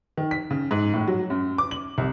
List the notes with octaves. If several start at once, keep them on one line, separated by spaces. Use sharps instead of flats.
D#3
B6
C#3
G#2
A2
F#3
F#2
D6
F#7
C2